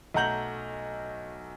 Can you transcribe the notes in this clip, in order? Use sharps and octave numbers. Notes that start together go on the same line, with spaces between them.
B1 A3 F#5 A#5 G6 F#7